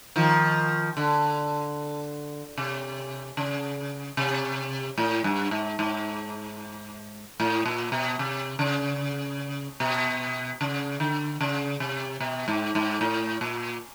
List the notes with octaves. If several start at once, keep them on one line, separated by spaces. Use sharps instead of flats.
D#3 F3
D3
C3
C#3
C3
A2
G2
G#2
G#2
A2
A#2
B2
C3
C#3
B2
C#3
D3
C#3
C3
B2
G#2
G#2
A2
A#2